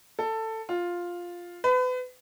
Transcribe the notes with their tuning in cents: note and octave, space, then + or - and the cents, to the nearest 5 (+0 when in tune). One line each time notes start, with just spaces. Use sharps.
A4 +15
F4 +5
B4 +35